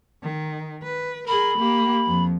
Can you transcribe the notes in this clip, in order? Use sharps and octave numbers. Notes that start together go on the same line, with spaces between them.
D#3
B4
G#4 A#4 B5
A#3 G4
F2 F3